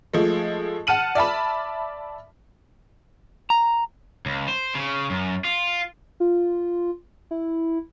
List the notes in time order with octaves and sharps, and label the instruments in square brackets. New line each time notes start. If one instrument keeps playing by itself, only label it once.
[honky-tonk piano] F3 G#3 A3
F#5 A5 F6 D#7 F#7
D5 E5 A5 B5
[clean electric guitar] A#5
[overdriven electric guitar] C#2
C5
C#3
F#2
F4
[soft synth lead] F4
E4